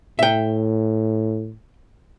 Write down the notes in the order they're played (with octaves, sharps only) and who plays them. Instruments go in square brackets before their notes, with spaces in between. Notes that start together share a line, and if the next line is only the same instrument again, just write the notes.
[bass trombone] A2 [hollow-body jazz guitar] E5 G5